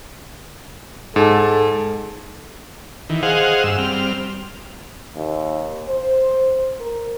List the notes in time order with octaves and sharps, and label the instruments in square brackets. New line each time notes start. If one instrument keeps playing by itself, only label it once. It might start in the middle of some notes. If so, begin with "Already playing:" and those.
[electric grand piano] G#2 [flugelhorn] A4
[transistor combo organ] D#3 E3
G#4 C5 D#5 F5 F#5
G2 E6
G3 C4 F6
[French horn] D#2
C5
A#4